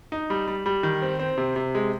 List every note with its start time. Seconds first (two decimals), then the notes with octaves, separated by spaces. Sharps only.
0.12 D#4
0.30 G3
0.47 G3
0.66 G3
0.83 D#3
1.02 C4
1.19 C4
1.37 C3
1.56 C3
1.75 G#3